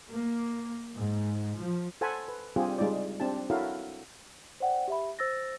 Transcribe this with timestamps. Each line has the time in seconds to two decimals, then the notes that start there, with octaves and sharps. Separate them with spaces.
0.11 A#3
0.95 G#2
1.58 F3
2.01 A4 C5 F#5 G#5 A5 B5
2.28 B4
2.56 G3 C4 D4 F4 G4 G#4
2.78 G3 G#3 D#4 F4 D5
3.20 C4 D4 G4 A5
3.50 E4 F#4 A4 A#4 C#5 F5
4.60 C5 D5 F#5 G5
4.88 G4 E5 B5
5.19 C5 E6 A6 A#6